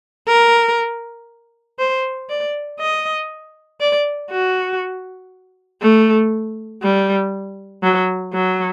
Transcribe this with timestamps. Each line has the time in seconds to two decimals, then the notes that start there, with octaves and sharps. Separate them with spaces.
0.28 A#4
1.79 C5
2.29 D5
2.80 D#5
3.80 D5
4.31 F#4
5.82 A3
6.82 G3
7.83 F#3
8.33 F#3